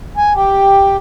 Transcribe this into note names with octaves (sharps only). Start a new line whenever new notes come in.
G#5
G4